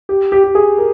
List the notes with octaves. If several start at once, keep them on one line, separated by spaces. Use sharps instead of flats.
G4
G4
G4
G#4
A#4